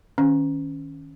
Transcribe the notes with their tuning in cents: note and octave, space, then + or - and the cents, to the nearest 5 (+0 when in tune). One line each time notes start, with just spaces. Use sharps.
D#3 +0 C#4 +0